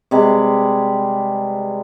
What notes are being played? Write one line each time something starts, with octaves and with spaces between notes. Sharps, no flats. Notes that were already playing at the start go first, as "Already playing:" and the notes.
C3 G3 G#3 B4